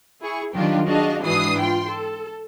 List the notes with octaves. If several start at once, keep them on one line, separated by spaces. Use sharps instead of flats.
E4 G#4 C#6
D#3 F#3 G3 D4 F4 G4
D4 F#4 G#4 D#5 F5 A5
G#2 E3 D4 F#4 D#6 C7
F4 G5 C6
A4